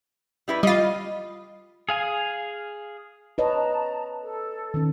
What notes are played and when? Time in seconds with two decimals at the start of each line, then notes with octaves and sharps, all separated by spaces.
0.48 G3 E4 B4
0.63 G3 F4 D#5
1.89 G#4 F5 G#5
3.38 B4 C#5 D#5 A5 A#5
4.23 A4
4.74 D#3 C#4